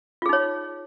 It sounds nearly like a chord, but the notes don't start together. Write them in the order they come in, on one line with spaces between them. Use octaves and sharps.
F4 G#4 D#4 C#5